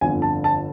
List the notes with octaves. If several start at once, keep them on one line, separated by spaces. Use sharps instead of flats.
G1 F2 D3 G#5
A5
A5